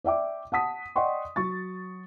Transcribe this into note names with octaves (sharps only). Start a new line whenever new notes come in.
D5 E5 G5 D6
F#5 A5 D#6 B6
D5 D#5 F#5 G5 C6 C#6
F#3 C#6 A6